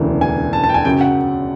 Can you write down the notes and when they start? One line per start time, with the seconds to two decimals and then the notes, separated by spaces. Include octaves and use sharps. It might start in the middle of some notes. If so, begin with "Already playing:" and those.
Already playing: E1 D2 C#3 E3
0.21 G#5
0.53 A5
0.64 A5
0.69 G5
0.74 G#5
0.85 F#2 C#3 F#3 G5
1.01 F#5